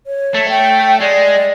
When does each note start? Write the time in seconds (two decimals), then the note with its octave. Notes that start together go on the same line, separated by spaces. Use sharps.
0.07 C#5
0.34 A3
0.49 G5
1.00 G#3 D5